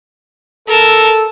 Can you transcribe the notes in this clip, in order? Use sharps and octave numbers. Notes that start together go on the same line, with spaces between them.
A4 A#4 A5